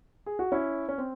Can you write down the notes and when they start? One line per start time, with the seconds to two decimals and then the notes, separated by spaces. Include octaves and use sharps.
0.26 G#4
0.39 F#4
0.52 C#4 E4
0.89 C#4
0.98 C4